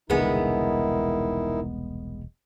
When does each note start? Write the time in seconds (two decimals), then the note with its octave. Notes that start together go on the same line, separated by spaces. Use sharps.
0.10 E1 C2 D3 D#3 G#3 B3 D#4 E4